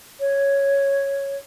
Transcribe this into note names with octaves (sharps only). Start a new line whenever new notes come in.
C#5